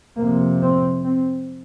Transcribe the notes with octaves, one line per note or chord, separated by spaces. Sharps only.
F2 C3 A#3
C4
C4